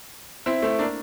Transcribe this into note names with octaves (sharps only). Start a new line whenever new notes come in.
C4 E4
A3 C4
A#3 D4